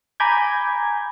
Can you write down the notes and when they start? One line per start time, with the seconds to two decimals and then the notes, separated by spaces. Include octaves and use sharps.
0.20 G#5 A#5 B5 D6 G6 G#6